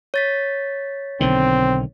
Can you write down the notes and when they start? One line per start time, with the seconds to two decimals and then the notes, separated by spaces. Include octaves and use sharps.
0.14 C#5 A6 B6
1.21 B1 D3 D#3 C4